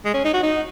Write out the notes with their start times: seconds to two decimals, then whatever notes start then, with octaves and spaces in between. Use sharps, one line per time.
0.05 G#3
0.14 C#4
0.25 D#4
0.33 F#4
0.43 D#4